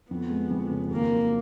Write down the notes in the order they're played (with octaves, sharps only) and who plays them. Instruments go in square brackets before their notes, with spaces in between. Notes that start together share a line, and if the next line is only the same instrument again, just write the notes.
[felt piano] F2 [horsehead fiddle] B3
[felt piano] G#3
F2
C#3
[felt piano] D#2 [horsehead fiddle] A#3
[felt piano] F#3